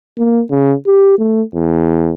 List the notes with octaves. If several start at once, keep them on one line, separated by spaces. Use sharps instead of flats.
A#3
C#3
G4
A3
E2